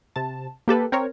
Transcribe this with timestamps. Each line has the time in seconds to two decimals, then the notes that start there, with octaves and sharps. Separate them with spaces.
0.16 C3 A5
0.68 A#3 G4 A4 B4
0.92 C4 A#4 C#5